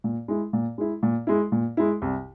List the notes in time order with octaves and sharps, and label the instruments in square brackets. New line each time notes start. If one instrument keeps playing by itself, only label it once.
[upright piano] A#2
G#3 E4
A#2
G#3 E4
A#2
G#3 E4
A#2
G#3 E4
C2